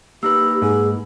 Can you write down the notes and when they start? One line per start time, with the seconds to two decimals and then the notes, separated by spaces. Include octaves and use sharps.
0.23 A#3 D#4 G4 B4 E6
0.62 G#2 G#4